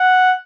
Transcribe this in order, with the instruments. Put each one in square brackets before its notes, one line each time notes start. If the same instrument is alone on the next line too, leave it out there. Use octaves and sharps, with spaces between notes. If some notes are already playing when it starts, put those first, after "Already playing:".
Already playing: [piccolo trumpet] F#5